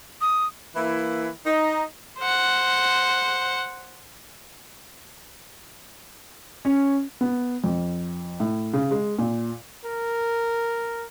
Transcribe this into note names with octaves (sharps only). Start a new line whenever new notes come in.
D#6
E3 A#3 E4
D#4
C5 F#5
C#4
B3
F2
A2
C#3
G#3
A#2
A#4